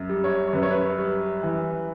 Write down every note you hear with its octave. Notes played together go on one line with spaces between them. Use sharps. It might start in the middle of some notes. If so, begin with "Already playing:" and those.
Already playing: F#2
G3
C#5
F#2 B4
C#5
B4
G3
E3